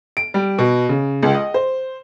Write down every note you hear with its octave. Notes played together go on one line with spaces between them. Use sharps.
D7
G3
B2
C#3
C#2
D#5
C5